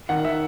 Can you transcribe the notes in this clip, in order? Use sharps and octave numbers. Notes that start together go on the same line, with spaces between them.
D#3 F#5
E5